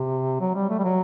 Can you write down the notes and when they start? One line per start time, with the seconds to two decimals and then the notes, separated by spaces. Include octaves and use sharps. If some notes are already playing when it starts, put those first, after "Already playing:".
Already playing: C3
0.40 F#3
0.55 G3
0.69 A3
0.79 G3
0.84 F#3